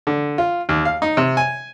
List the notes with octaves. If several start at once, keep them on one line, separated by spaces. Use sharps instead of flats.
D3
F4
D#2
F5
D#4
C3
G#5